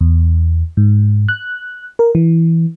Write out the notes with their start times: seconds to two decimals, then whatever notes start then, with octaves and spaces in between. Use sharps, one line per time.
0.01 E2
0.77 G#2
1.29 F#6
1.99 A#4
2.15 E3